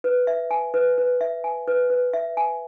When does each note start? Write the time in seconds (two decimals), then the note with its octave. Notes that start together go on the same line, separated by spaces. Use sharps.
0.04 B4
0.27 E5
0.51 G#5
0.74 B4
0.98 B4
1.21 E5
1.44 G#5
1.68 B4
1.90 B4
2.13 E5
2.37 G#5